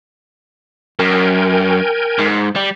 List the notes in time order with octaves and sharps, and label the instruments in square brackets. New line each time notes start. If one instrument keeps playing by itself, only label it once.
[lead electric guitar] F#2 [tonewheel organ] A#4 G5 G#5
[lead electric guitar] G#2
G3